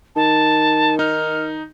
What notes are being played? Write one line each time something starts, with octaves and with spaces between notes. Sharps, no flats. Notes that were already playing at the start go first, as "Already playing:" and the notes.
D#3 A5
D#4 F6